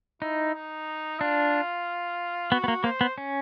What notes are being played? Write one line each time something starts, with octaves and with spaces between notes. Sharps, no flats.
D#4 E4
D#4
D4 F4
B3 F#4
B3
A#3
A#3 C5
B3
C#4